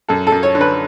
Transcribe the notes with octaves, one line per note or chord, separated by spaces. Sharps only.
F#2 A4
A4
F#2
C#5
D3
B4